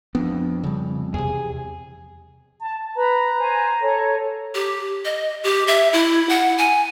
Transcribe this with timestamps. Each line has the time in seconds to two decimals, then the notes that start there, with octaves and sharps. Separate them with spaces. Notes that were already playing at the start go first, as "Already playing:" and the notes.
0.15 F2 B3 D4
0.64 C#3 G3
1.14 E2 C3 G#4
2.60 A5
2.95 B4 A#5 B5
3.37 C5 G#5
3.80 A4 C#5
4.54 G4
5.05 D#5
5.44 G4
5.67 E5
5.93 E4
6.29 F#5
6.58 G#5